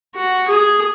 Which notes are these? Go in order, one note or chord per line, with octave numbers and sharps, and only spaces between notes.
F#4
G#4